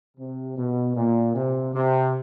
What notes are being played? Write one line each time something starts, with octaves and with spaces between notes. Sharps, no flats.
C3
B2
A#2
C3
C3